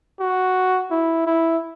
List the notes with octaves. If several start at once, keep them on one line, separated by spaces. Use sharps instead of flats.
F#4
E4
E4